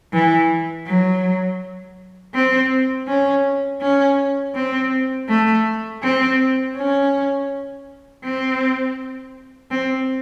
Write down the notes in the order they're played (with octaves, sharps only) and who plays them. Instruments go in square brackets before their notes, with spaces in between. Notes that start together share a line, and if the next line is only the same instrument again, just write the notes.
[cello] E3
F#3
C4
C#4
C#4
C4
A3
C4
C#4
C4
C4